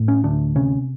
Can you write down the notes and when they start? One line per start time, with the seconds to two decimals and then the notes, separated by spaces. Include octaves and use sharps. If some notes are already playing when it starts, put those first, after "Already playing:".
Already playing: A2
0.08 C#4
0.24 D2 D4
0.55 C3 C#4